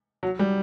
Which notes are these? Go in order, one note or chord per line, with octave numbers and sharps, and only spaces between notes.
F#3
G3